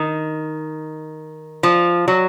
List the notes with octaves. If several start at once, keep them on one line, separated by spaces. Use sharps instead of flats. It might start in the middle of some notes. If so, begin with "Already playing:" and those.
Already playing: D#3
F3
F#3